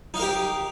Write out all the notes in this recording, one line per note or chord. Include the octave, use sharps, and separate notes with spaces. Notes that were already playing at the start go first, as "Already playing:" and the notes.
D#4 G4 A#4 F5